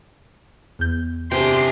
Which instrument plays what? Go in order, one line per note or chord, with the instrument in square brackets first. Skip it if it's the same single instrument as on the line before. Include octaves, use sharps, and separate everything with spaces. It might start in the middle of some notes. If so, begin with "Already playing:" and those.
[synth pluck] E2 G6
[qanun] C3 D4 [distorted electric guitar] G#4 G5 [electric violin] C6